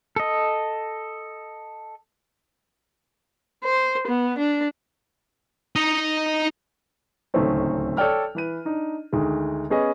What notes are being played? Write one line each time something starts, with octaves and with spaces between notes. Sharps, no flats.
A4 D#5
C5
B3
D4
D#4 D#5
D1 C#2 D#3 A3 C4 C#4
A4 C#5 D5 G5 F6
E3 B4 D#7
D4 D#4
D2 D#3 G#3
B3 C#4 G#4 D#5